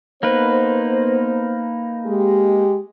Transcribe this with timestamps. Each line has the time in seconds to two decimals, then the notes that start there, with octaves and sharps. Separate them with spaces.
0.23 A#3 B3 D#4 B4 C5
2.06 G#3 G4